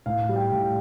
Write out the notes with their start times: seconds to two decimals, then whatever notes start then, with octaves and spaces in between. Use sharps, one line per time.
0.06 A2 F5
0.29 G3
0.36 G5
0.52 A2